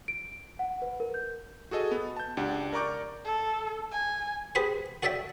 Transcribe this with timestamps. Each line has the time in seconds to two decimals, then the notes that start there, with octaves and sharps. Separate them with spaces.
0.08 D7
0.59 F#5
0.82 B4
1.00 A#4
1.14 G6
1.71 F#4 G#4 A4 D#5
1.91 B3
2.17 A5 G6
2.37 C#2 D4 G4 F#5
2.73 A#4 D5 A#5 C#6 D6 G6
3.25 A4
3.92 G#5
4.55 G4 G#4 B4 C5
5.03 F#4 A4 C#5 D5 E5 G5